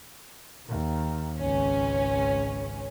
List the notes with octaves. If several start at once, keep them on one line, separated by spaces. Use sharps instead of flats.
D#2 D#3
G#1 C#2 C#4